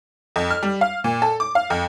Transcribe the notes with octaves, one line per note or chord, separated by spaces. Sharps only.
F2
F6
G3
F5
A#2
A4
D6
F5
F2